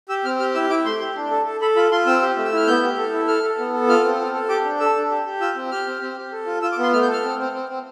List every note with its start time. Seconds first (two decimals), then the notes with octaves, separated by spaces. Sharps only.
0.09 G4 E6
0.25 C4 F6
0.40 G4 F6
0.54 E4 E6
0.70 E4 D6
0.85 A3 C6
1.00 G4
1.16 D4
1.31 A4
1.45 A4
1.61 A4 B5
1.76 F4 B5
1.91 F4 C6
2.06 C4 E6
2.22 G4
2.37 A3
2.45 E6
2.52 E4 F6
2.67 B3 G6
2.83 G4
2.97 A4
3.14 E4
3.27 A4 F6
3.43 A4
3.58 B3
3.73 A4
3.88 F4 F6
4.05 C4
4.20 A4
4.34 A4
4.49 G4 D6
4.64 D4
4.80 A4 E6
4.96 D4
5.10 G4
5.26 G4
5.41 F4 E6
5.56 C4
5.71 G4 F6
5.86 C4
6.01 C4
6.17 G4
6.32 A4
6.46 F4
6.62 F4 E6
6.72 D6
6.78 B3 C6
6.93 A3 F6
7.02 G6
7.08 A4
7.13 F6
7.23 C4
7.38 C4
7.53 C4
7.69 C4